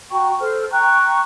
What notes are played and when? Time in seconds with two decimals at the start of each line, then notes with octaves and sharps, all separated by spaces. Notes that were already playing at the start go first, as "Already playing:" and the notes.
0.10 F#4 G5 A#5 C#6
0.41 A4 C5 F6
0.71 G5 A#5 C#6 F#6